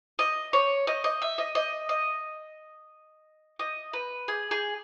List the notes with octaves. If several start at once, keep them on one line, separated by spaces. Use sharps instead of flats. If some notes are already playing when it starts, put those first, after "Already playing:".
D#5
C#5
D#5
D#5
E5
D#5
D#5
D#5
D#5
B4
G#4
G#4